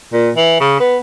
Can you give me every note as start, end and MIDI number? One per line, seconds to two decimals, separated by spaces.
0.13 0.30 46
0.36 0.59 52
0.60 0.77 49
0.80 0.97 59